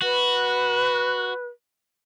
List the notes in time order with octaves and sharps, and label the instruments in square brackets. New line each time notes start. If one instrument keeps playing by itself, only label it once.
[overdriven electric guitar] F#4 [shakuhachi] B4